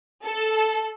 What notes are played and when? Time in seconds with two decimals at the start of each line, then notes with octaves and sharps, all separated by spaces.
0.23 A4